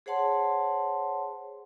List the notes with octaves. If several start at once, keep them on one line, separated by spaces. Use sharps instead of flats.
G#4 C5 C#5 F#5 A5 C6